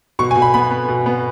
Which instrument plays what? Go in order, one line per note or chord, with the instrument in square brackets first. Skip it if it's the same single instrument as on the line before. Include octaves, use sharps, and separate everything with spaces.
[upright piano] B2 C#6
G#5
B2
B5
B3 B5
B3
B2
B3